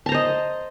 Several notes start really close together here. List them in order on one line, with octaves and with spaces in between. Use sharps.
A5 A#5 C5 D#5